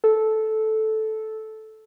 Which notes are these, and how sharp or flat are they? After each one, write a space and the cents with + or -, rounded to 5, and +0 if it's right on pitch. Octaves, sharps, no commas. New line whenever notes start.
A4 -10